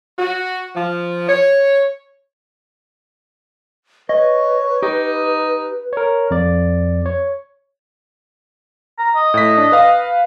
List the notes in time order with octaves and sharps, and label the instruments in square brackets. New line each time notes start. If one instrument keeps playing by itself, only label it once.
[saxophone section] F#4
F3
C#5
[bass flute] B4 [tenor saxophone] C#5 [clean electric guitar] D#5
[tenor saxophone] D#4 [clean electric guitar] G4
[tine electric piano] A#4 C#5
F2 D5
C#5
[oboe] A#5
D#5
[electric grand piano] A2 B6
D4
B4 F5